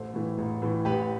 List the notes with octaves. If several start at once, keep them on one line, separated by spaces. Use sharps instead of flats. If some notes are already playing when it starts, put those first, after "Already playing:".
Already playing: A1 A4 C5
A2 E3
A1
A2 E3
A1 G4 B4